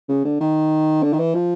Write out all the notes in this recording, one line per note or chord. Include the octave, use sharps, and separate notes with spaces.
C#3
D3
D#3
D3
D#3
E3
F3